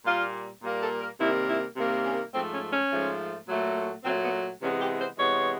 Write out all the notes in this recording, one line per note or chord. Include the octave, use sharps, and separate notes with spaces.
A#2 G3 A#3 F4
A#2 G3 A#3
A4
A#4
C3 D#3 G3 A#3 E4
E4
C3 D#3 G3 A#3
C#4
G#2 F3 A3 C4
C#4
C#4
G#2 F3 A3
A#2 F#3 A3
A#2 F#3 A3 C4
B3
C3 E3 G#3 B3 C#4
G4
C5
C3 E3 G#3 B3 C#5